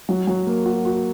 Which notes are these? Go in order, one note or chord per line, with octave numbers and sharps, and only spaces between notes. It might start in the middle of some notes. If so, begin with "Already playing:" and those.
F#3
F#3
A#3
F#4
F#4